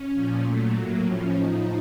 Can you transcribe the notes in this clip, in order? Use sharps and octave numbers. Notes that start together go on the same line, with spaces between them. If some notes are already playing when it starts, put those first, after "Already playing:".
Already playing: C#4
A#2 F3
A#2 F#3 A3
A2 F#3 A#3
A2 F3 C#4
A2 F3 D#4